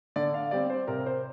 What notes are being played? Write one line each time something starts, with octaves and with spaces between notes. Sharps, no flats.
D3 D5
F5
G3 C4 D5
C5
C3 A#4
C5